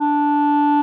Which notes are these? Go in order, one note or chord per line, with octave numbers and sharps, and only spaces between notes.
D4